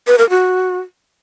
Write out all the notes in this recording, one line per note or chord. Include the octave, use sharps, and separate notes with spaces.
B4
A#4
F#4